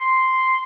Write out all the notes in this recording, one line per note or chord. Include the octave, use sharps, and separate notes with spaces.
C6